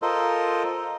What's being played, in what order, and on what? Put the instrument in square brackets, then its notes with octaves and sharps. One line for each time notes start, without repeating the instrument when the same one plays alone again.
[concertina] F4 A4 A#4 C5 D#5